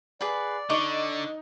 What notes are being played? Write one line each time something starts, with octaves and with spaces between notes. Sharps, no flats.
G#4 B4 D5 F#5
D3 D#4 C#6 D6